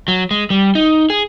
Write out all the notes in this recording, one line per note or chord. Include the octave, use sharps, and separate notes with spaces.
F#3
G#3
G3
D#4
G#4